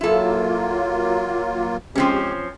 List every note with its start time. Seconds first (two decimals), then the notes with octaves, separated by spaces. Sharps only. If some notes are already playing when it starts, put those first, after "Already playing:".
0.01 F#3 A#3 E4 F4 A4
1.95 F3 G#3 C4 C#4 G4